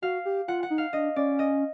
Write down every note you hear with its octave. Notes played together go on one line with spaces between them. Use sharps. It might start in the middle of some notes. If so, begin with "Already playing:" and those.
F#4 F5
G4
F4 F#5
F#5
D#4
F5
D4 D#5
C#4 D5
D#5